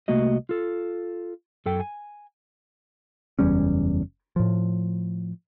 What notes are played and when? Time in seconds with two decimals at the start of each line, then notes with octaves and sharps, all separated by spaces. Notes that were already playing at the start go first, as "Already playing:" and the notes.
0.08 C2 A3 A#3 F#4 D#5
0.49 F4 A4
1.66 F#2 A4 G5
1.80 G#5
3.39 F#1 E2 G3 C#4
4.36 A2 F3